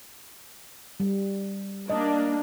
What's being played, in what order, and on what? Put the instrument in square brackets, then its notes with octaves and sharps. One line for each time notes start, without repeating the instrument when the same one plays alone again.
[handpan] G3
[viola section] A#3 D4 [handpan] D#5